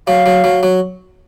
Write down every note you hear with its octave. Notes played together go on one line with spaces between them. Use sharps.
F#3 F5
F#3
F#3
F#3